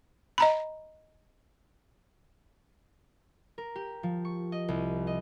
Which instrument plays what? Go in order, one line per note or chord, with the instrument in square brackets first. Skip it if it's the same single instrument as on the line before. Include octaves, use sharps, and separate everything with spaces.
[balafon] D#5 A#5 B5
[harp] A#4
G4
F3
C#6
D#5
C2
D#5